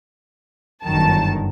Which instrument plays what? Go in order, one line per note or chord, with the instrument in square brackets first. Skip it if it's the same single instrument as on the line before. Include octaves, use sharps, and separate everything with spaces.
[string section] G1 F#2 D#3 A5